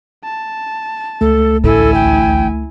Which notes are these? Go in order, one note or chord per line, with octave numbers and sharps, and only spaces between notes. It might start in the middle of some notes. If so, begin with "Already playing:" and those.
A5
C#2 A3 A4
A1 D2 A2 E4 A4 G#5
G5